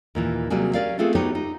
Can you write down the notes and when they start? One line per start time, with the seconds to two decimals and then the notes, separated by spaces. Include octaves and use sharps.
0.15 D#2 A#2 E3
0.50 C3 F#3 G3 A#3 F#4 G#4
0.74 C#4 A#4 D5 F5
0.99 A3 B3 C4 F4 G#4 A4
1.15 B3 D#4 F#4 G4 B4 C#5
1.35 D#4